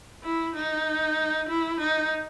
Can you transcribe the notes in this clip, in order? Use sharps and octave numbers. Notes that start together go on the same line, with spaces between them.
E4
D#4
E4
D#4